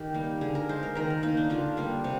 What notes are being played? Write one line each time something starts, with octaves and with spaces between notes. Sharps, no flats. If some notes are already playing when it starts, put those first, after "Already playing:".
Already playing: D#3 G4
G3 A#3
D3 G#4
A#4
G#3 C5
A#4
D#3 A#4
A#4
A#3 D#4
D4
D3 F4
G3 A#3
C3